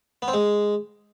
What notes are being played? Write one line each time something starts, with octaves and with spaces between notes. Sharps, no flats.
B3
C4
G#3